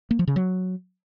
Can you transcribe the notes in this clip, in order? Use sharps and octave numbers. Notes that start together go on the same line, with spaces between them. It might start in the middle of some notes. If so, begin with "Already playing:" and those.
A#3
F3
C#3
F#3